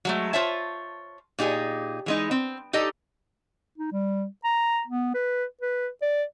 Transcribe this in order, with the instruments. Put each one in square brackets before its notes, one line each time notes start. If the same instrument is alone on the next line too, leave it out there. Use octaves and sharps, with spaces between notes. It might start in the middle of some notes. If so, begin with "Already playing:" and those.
[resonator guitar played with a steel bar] F#3 G#3 A3
F4 C5 C#5 E5 A5
A#2 D#4 G4 G#4
E3 G#3 D#4
C4
D#4 G4 A4 D#5
[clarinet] D#4
G3
A#5
B3
B4
B4
D5